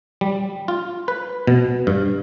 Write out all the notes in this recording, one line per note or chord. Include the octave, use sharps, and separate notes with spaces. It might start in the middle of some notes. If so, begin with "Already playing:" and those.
G3
F4
B4
B2
G2